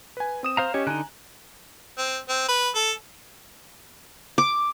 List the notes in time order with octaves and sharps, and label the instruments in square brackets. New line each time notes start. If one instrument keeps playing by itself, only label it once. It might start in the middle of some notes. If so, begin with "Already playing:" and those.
[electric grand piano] B4 G#5
C4 D#6 E7
[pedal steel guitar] C5 F5 A#5
[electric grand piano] C#4 G4 D#5 [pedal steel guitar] C#5
[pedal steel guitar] D3 D#4 [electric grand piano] G#5 A#5 F#6
[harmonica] C4
C4
B4
A4
[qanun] D6